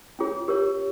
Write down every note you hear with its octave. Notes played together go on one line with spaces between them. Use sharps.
C#4 F4 G#4 C#5
G4 A#4 C#5